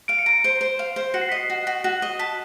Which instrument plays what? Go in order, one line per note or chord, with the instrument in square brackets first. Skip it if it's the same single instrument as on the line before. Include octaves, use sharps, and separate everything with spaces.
[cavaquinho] F5 [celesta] D7
[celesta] C#7
[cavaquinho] A#5 [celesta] D7
[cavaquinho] C5
C5
F5
C5
[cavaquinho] F#4 [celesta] C#7
[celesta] C7
[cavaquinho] D#5 [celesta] B6
[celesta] C7
[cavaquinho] F#4
F#4
F#4
D#5
[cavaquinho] A5 [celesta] B6